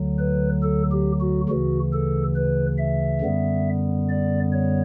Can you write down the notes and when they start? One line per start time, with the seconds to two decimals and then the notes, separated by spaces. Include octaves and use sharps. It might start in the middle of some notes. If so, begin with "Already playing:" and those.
Already playing: D2 D3 F#3
0.18 B4
0.62 A4
0.92 G4
1.21 F#4
1.49 D2 C#3 E3 F#4
1.93 A4
2.35 B4
2.79 E5
3.22 F#2 D3 G3 B3
4.09 D5
4.52 C#5